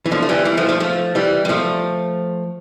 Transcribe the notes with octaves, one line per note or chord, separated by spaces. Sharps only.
E3
D3 F3
A3
E3 G3
E3 G3
F3 A3
F3 A3
F3 A3
E3 G3
G3
F3 A3